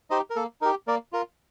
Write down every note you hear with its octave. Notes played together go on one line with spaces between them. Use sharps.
D#4 G4 C5 D#5
A#4
A#3 A4
D#4 G4 A#4
A#3 A#4 D5
F4 A#4